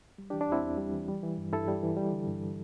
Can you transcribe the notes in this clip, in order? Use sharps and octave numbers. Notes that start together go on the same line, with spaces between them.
G3
E3 D4 G4
D4
E2 C4 E4
E2
G3
E3
G3
E3
G2
G2 E4 A4
G3
E3
G3
D3
G2